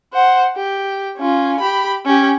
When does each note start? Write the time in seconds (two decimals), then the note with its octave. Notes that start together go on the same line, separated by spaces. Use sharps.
0.14 C5 F#5
0.56 G4
1.18 C#4 F4
1.60 G4 B5
2.06 C#4 G4